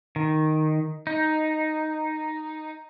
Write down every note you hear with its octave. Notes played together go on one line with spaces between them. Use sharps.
D#3
D#4